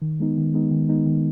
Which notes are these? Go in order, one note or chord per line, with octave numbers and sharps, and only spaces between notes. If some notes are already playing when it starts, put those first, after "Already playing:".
D#3
G#3 B3 D#4
D#3
G#3 B3 D#4
D#3
G#3 B3 D#4
D#3